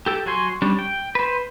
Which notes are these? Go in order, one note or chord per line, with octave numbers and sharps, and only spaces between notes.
G4 A4 G5
F#3 F#4 C#5 G#5 C6
G3 C#4 D4
G5
B4 C5